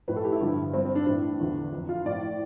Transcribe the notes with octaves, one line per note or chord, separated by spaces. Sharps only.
A2 F3 B4
A4
G4
E4
G2 D3 F3
G2 F3 C4
C4
D4
A2 E3 D4
E2 D3 F3
F2 E3
F4
A2 F3 D5